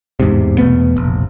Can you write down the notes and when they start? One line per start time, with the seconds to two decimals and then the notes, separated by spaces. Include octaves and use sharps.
0.20 A1 E2 G#2 C3
0.58 E2 B2 A3 B3
0.96 F1 A#1